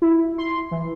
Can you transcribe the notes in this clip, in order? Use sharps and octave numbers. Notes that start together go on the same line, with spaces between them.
E4
C6
E3